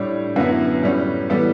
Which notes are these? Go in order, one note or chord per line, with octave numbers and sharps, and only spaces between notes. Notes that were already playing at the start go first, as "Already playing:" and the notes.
Already playing: A2 G3 D4 C#5
F#2 D3 F#3 B3 E4 B4
A2 G3 C#4
E3 G3 B3 A4